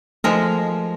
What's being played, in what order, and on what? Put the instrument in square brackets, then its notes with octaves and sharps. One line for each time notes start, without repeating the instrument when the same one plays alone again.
[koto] F3 G#3 A#4 [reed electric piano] A3